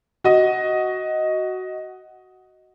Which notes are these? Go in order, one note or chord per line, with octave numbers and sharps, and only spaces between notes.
F#4 D#5